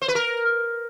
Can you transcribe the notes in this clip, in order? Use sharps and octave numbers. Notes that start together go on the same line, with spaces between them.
C5
B4
A#4